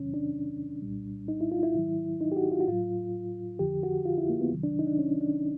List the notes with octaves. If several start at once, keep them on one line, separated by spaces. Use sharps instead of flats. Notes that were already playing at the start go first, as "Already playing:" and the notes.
Already playing: E2 C3 D#3 F#3 C#4
D4
C2 A#2 G3
D#4
E4
F4
E4
G#2 D#3 F#3
D#4
G4
F#4
F4
F#4
A2 F#3 F4
F2 D3 F3 G4
F#4
F4
E4
A#3
B3
C2 C3 D#3 F#3
D4
D#4
D4
C#4
D4